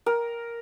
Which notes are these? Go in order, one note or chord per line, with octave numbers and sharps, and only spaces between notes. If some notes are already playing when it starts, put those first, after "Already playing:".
A#4